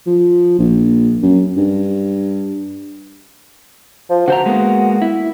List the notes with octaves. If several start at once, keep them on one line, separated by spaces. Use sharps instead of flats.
F3
A#1
F#2
G2
F3
D3 F#4 C5 A#5
G#3 A#3 B3
E4